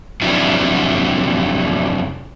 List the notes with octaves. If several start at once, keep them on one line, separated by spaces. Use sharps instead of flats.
F2 C3 F#3 C#4 D4 E4